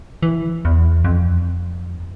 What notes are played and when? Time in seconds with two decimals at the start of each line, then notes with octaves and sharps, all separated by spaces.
0.23 E3
0.65 E2
1.05 F2